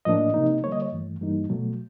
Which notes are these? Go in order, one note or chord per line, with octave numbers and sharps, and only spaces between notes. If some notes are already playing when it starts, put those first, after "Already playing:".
A2 F3 A#3 D4 D#5
C3 F3 A#3 D#4
D3 G3 A#3 C#5
D#5
C#5
G2 E3 A3
G2 E3 G3 A#3 D#4
B2 F#3 A3